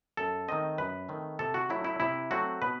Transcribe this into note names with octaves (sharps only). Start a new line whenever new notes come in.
F#2 A4
D#3 A3 C4 D#5
F#2 B4
D#3 A3 C4
C3 A4
F#4
F#3 A3 C4 E4
E4
C3 E4
F#3 A3 C4 F#4
B2 B4